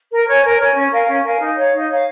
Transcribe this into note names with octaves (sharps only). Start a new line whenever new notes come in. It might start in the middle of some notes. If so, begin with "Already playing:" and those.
A#4
C#5 G#5
A#4
C#5 G#5
C#4
A#4 F5 G#5
C#4
A#4 F5 G#5
D#4
C#5 F5
D#4
C#5 F5